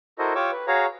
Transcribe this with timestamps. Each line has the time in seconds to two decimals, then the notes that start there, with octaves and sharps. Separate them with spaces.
0.19 E4 F#4 A4 A#4 C5 D#5
0.35 F4 G4 C#5 C#6 D6 E6
0.52 B4
0.67 F#4 G#4 C#5 F5 A#5